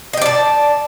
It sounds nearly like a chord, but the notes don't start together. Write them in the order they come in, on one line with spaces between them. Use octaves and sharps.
D#5 G5 D5 A5